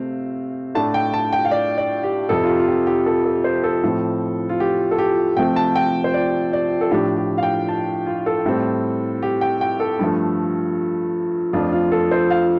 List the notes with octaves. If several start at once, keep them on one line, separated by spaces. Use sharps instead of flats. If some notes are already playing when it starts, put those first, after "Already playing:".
Already playing: C3 A3 C4 F5
A2 A3 D4 A5
G5
A5
G5
F5
D5
D5
G4
F2 C3 F3 A4
F4
G4
F4
G4
G4
A4
A4
C5
A4
A2 F3 C4
F4
G4
A4
G4
C3 F3 A3 C4 G5
A5
G5
C5
D5
D5
A4
A2 F3 D4 G4
G4
F5
G5
A5
F4
A4
A2 G3 C4
G4
G5
G5
A4
G2 F3 A3
F2 F3 A3 D4 F4
F4
A4
C5
F5